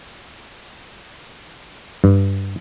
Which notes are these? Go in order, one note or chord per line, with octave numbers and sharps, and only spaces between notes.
G2